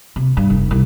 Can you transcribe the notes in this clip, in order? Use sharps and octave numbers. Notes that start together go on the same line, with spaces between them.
C3
G2
F1
C2